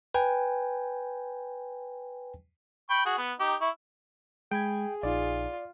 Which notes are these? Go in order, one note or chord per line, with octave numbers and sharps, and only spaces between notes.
B4 G5 G#5
G5 B5 C#6
F#4 G#4
B3
D#4 G4
E4 C#6
G#3 G#4 G5 B5 G#6
A#1 D#4 F4 D5